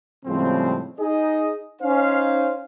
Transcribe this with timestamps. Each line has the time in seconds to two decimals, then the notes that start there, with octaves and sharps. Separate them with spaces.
0.25 A2 C#3 F3 G3 G#3 C4
0.99 D#4 G#4 D#5
1.82 C#4 D#4 C5 F5